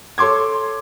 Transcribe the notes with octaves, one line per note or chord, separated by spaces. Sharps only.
A4 C#5 C6 D6 G#6